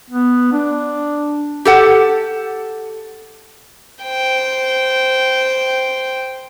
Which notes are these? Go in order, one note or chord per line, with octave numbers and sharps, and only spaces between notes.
B3
D4
G4 A4 F#5
C5 G5